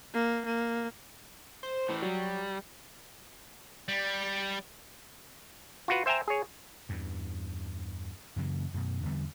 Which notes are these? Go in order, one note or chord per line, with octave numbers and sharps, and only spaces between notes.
A#3
A#3
C5
A2 E3
F#3 G3
G3
F4 F#4 B4
C5 E5 G5 G#5 A#5
G#4 C#5
E2 G2
F#2 C#3 E3 A#3
F#2 B2
E2 D3 G3 B3